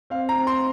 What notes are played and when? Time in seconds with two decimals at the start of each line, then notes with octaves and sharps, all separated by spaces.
0.10 C4 F5
0.29 A#5
0.35 C4
0.47 C6